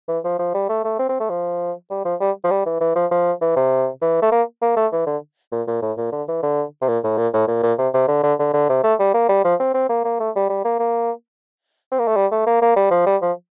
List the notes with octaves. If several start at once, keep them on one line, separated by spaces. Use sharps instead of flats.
E3
F3
F3
G3
A3
A3
C4
C4
A3
F3
G3
F3
G3
F3
G3
E3
E3
F3
F3
E3
C3
E3
A3
A#3
A#3
A3
E3
D3
A#2
A#2
A2
A#2
D3
E3
D3
C3
A#2
A2
A#2
A2
A#2
A#2
C3
C3
D3
D3
D3
D3
C3
A3
G3
A#3
G3
F3
C4
C4
A#3
A#3
A3
G3
G3
A#3
A#3
C4
A#3
A3
G3
A3
A#3
A#3
G3
F3
G3
F3